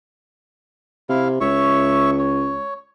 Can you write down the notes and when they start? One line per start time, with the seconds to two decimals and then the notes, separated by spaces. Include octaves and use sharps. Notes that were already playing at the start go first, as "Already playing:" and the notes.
1.09 C3 E4 F5
1.41 C#2 C#5 E5 C#6
2.19 C#5